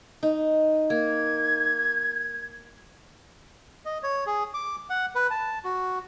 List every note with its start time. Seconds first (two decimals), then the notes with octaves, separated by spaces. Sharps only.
0.23 D#4
0.90 A#3 G#6
3.85 D#5
4.03 C#5
4.27 G#4
4.54 D6
4.90 F#5
5.15 B4
5.31 A5
5.64 F#4